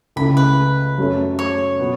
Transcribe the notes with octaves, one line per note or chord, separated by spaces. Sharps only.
C#2 C#3 A3 E4 B5
B4
F#2 F#3 A3 C#4
C#5
B2 B3